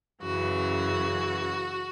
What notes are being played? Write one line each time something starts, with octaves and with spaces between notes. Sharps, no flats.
F#2 C#3 E3 F#4